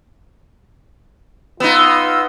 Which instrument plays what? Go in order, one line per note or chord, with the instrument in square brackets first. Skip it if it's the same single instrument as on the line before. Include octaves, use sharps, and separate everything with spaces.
[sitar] B3 D#4 [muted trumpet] F4 [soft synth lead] E6